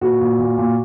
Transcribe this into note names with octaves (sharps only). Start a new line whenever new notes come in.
A#2 F#4
A#2
A#2
A#2